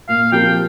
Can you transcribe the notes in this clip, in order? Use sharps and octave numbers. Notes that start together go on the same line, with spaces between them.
A#2 F5
F3 C4 G4 A#4 G5